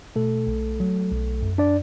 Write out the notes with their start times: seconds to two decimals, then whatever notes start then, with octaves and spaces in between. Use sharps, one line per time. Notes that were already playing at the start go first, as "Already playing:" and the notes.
0.16 B2 A3 A4
0.47 B1
0.80 F#3
1.12 B1
1.42 F#2
1.58 D4 D5